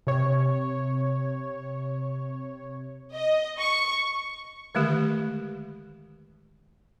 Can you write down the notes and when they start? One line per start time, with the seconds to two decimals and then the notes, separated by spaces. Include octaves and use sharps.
0.07 C3 C#5
3.15 D#5
3.60 C#6
4.75 D3 D#3 G#3 A3 G4